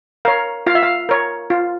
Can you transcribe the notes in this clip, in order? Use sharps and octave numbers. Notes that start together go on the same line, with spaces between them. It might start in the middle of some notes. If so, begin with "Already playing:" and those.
A#4 C#5 F5
F4 F5
E5
F5
A#4 C#5
F4